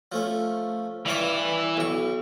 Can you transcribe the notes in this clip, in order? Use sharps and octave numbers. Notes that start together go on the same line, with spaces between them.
F3 A3 C#4
G2 E3 C#4 E4 D5
B1 C#6